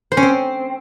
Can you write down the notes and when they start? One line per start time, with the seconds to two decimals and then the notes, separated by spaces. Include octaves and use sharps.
0.12 C5
0.17 C#4
0.23 C4